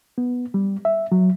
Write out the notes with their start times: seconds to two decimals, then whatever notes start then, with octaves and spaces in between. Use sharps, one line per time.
0.18 B3
0.54 G3
0.85 E5
1.12 F#3